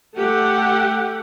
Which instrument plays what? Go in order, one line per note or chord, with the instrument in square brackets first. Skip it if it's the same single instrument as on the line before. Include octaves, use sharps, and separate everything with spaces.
[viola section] A3 G4 F#5